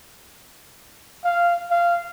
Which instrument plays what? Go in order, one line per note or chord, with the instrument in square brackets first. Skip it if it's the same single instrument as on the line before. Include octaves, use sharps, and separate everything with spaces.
[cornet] F5
F5